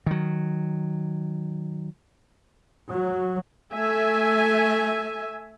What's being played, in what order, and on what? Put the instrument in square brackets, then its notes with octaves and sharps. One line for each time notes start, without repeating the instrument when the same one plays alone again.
[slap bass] D#3 F#3
[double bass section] F#3
[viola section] A3 E5 G#5